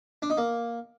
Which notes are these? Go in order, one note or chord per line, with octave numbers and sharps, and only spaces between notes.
D4
D#4
A#3